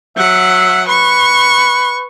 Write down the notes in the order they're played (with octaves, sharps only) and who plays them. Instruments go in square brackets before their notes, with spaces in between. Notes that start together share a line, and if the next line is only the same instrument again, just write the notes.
[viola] F#3 F#5 [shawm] E5
[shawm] B4 [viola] C#6